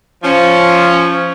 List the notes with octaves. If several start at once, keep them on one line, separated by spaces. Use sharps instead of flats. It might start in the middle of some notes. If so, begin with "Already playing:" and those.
F3 C#4